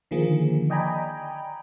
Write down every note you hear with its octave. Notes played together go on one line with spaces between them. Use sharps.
D3 D#3 F3 A#3 G#4
D5 D#5 G5 G#5 A#5 B5